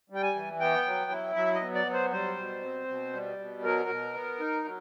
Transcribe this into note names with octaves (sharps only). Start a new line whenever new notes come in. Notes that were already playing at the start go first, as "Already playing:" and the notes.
G3
G5
G#5
E3
B3 G5
F#3
E4
F#3 E5
D#5
B3
D5
F#3
C5
G3 C5
B2
C4
B2
G3
B2
F#3 A#4
B2
B3
D#4
F#3